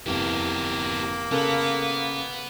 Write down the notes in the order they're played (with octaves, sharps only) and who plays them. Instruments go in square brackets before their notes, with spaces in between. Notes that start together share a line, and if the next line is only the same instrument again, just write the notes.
[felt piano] F1 E3 [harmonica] A#3 [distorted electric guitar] B3 G4
[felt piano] C#3 A4 A#4 [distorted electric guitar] B3